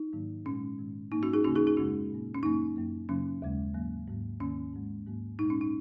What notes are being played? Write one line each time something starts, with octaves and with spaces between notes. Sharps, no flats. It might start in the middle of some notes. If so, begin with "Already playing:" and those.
Already playing: D#4
G#2 D#3 F#3 A#3
A#2 G#3 C#4
G#2 D#3 G#3
G#2 F#3 A#3 D#4
C#4 F#4
D#4 G#4
D#2 C#3 A#3 C#4 F#4
D#4 G#4
D#4 G#4
F#2 C#3 G#3 C#4 F#4
A#2 A#3
C#4
F#2 C#3 F#3 A#3 D#4
F#2 F#3 A#3
F#2 C#3 F#3 A#3 C#4
D#2 C#3 G#3
G#2 F#3 A#3
G#2 F#3 A#3
D#2 D#3 A#3 C#4
G#2 G#3
G#2 F#3 A#3
A#2 G#3 D#4
C#4
D#4